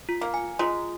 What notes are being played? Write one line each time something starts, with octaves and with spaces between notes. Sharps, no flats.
F4
A#3
G#5
G#3 F4